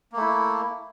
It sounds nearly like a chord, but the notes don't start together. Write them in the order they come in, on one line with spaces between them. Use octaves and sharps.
A#3 A3 E4